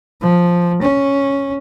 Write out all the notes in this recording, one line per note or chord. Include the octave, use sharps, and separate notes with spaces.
F3
C#4